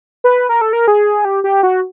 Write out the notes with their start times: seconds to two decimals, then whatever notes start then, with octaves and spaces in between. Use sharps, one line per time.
0.24 B4
0.49 A#4
0.61 A4
0.73 A#4
0.88 G#4
1.25 G4
1.44 G4
1.63 F#4